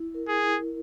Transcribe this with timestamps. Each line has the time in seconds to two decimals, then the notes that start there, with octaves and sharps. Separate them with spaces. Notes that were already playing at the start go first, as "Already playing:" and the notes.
Already playing: E4
0.14 A#4
0.28 G#4
0.42 E4